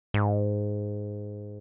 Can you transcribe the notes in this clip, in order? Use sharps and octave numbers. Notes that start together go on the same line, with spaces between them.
G#2